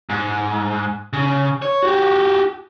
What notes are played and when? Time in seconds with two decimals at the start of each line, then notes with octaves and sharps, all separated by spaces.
0.10 G#2
1.13 C#3
1.62 C#5
1.83 F#4 G4